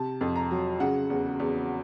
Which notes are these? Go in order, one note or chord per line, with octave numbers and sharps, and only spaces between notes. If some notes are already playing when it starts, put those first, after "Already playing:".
Already playing: C3 A5
F2
A#5
F#3
C#3 F#5
E2
E2